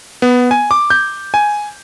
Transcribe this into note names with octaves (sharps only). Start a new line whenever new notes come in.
B3
G#5
D6
G6
G#5